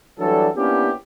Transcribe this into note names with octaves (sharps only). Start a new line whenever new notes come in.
E3 F#3 G3 D4 A4
A#3 B3 C#4 D4 E4 G4